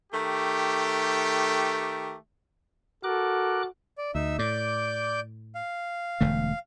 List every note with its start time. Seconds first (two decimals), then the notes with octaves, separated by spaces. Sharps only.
0.13 D#3 A3 G4
3.04 F#4 A4 A#4 D6 F#6
3.98 D5
4.15 D2 D#4 E5 E6
4.39 A2 D5 D6 G6
5.55 F5
6.21 E1 D3 A3